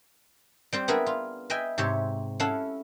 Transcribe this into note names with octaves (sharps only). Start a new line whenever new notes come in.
G3 C4 G4
B3 D4 G#4 A#4 B4 E5
F4
B4 D#5 E5 G5 G#5
G#2 C3 G4 C#5 E5
C#4 E4 A4 F5 F#5 A5